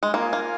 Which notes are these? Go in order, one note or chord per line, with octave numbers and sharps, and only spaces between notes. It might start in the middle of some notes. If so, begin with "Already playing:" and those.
G#3
A#3 F4 A#4 F5 G#5
A#3